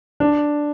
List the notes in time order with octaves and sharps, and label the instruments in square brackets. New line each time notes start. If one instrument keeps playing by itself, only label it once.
[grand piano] D4